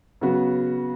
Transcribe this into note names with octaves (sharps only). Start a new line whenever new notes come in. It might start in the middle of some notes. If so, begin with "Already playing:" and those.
C#3 F#3 B3 F#4